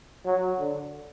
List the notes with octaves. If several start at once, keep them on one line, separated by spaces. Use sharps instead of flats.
F#3
D3